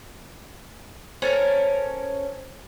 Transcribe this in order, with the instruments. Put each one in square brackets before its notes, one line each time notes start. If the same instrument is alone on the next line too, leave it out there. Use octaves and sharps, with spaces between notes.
[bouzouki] C#4 A4 A#4 [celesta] C5